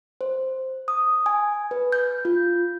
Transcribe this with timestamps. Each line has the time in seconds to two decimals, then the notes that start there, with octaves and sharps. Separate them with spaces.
0.21 C5
0.88 D#6
1.26 G#5
1.71 B4
1.92 G6
2.25 F4